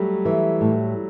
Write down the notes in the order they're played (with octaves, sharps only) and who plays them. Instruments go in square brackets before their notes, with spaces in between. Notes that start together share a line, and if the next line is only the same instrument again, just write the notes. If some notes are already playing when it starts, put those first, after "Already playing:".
Already playing: [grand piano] F#3 G3 A3
[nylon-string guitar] E3 [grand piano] A3
[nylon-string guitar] A2